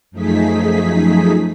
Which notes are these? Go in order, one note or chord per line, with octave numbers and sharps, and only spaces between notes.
F#2 F3 A3 D#4 G#4 B6